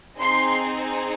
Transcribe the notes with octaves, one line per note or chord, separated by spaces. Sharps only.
C4 D#4 G#4 C6